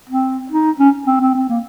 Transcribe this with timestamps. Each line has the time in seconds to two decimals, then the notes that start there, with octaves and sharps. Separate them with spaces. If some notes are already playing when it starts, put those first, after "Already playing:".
0.09 C4
0.51 D#4
0.79 C#4
1.07 C4
1.21 C4
1.35 C4
1.49 A#3